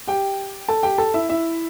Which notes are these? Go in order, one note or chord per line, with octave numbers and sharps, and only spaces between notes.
G4 G5
A4 A5
G4 G5
A4 A5
E4 E5
E4 E5